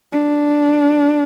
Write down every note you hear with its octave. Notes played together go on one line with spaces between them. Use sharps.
D4